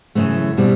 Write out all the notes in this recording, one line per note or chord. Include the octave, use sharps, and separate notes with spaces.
F#2 C#3 E3 A3
B2 G3 C4